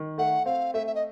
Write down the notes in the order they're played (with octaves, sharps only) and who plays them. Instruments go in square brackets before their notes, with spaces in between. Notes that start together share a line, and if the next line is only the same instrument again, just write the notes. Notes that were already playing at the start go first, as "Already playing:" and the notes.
Already playing: [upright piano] D#3
[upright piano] A3 [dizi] F#5
[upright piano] C4 [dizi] F5
[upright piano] A3 [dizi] E5
[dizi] E5
D#5